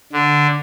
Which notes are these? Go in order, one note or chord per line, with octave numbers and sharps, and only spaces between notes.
D3